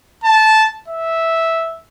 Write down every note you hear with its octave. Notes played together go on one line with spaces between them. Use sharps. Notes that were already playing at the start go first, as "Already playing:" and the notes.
A5
E5